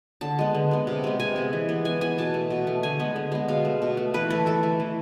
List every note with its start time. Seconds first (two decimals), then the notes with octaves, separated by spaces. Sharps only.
0.21 D3 A5
0.39 G#3 B3
0.55 D3
0.71 G#3 B3
0.87 C3
1.04 G#3 B3
1.20 C3 G#5
1.36 G#3 B3
1.53 E3
1.69 B3
1.85 E3 G#5
2.01 B3 G#5
2.18 B2 A5
2.34 A3
2.50 B2
2.67 A3
2.83 D3 G#5
2.99 G#3 B3
3.16 D3
3.32 G#3 B3
3.48 B2 F5
3.65 A3
3.82 B2
3.97 A3
4.14 E3 B4
4.30 A3 A4
4.46 E3 A4
4.63 A3
4.80 E3